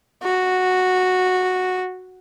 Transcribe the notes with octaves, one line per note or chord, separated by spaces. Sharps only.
F#4